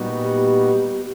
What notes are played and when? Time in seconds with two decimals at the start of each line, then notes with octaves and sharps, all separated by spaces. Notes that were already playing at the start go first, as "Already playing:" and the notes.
Already playing: A#2 G3 B3 D#4 F#4
0.22 G4